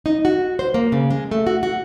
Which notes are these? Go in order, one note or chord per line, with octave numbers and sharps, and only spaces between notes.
D#4
F#4
C5
A#3
C#3
G#3
A3
F#4
F#4